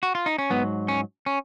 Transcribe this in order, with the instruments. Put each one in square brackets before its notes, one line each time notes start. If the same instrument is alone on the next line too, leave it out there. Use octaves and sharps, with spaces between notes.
[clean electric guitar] F#4
F4
D#4
C#4
G#2 F#3 B3
C#4
C#4